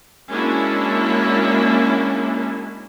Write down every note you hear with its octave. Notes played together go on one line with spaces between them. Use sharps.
G#3 A#3 C#4 D4 E4 F#4